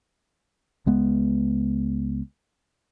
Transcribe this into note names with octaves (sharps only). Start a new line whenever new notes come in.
C#2 G#3 B3